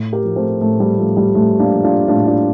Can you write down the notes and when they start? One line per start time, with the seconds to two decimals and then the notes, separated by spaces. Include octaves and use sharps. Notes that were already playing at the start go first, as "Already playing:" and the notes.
Already playing: A2
0.13 G4 A#4
0.25 F3
0.36 A3 C4
0.61 A2 A3
0.80 G3
0.98 F3 A3
1.17 G3
1.35 A2 A3
1.59 A#3 D4
1.71 F3
1.83 D4 F4
2.08 A2 D4 F4
2.27 D4 F4